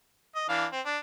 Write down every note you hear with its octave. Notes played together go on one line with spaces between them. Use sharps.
D#5
E3 D4 F5
C4
D4